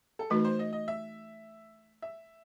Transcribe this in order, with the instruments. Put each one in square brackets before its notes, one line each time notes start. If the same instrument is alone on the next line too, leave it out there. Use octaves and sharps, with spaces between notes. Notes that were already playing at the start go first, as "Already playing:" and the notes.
[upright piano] A4
[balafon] E3 A3 D#4 F#4 [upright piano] B4
[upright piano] C5
D#5
D#5
E5
E5